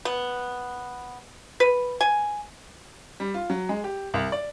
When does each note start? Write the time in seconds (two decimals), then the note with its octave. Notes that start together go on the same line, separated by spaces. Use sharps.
0.05 B3
1.60 B4
2.01 G#5
3.20 G3
3.34 F4
3.50 F#3
3.69 G#3
3.84 G4
4.14 C2
4.32 D5